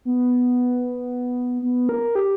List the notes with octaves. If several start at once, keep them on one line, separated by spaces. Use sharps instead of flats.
B3
B3
A#4
G4